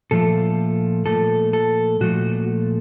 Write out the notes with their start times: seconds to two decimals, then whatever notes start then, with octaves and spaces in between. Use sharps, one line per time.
0.11 A#2 F3 A3 A4
1.06 A#2 F3 A3 A4
1.53 A4
2.01 A#2 F3 A3 F#4